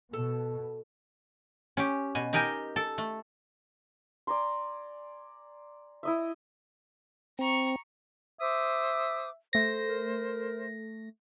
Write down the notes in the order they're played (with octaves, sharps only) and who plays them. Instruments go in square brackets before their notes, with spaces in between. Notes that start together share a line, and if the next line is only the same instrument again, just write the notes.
[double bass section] B2 [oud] A4
[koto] C#4 G4
B2 G#5
D#4 G4 A#4 G5 G#5
A4
A3
[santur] D5 G#5 A#5 C6
E4 D#5 E5
[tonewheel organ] C4 [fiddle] A#5 C#6
[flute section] C5 D6 D#6 [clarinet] E5
[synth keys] A3 A#6 [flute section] C5
[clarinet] A#4